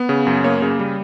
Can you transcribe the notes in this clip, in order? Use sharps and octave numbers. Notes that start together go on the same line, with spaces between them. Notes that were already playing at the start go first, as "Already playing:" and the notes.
Already playing: B3
C#3
F#2
A#3 C#5
C#3
G3